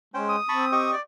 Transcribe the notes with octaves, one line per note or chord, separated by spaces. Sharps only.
G#3 C#4 C5 G5
D#6
C4 A5 B5 C#6
G4 D#5 C#6
D5